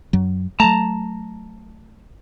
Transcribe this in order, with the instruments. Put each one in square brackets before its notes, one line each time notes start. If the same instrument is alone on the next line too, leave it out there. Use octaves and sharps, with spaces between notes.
[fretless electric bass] F#2 F#3
[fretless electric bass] F#3 A3 [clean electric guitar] A5 A#5